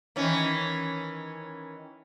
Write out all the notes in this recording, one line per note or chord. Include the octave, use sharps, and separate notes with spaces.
D#3 E3 C#4